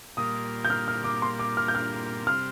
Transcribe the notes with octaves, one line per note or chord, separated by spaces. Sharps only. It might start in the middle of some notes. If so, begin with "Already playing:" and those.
A#2 G3 A#3 F4 D#6
G6
F6
F6
D6
C6
D6
F6
G6
F6
C3 G3 C4 F6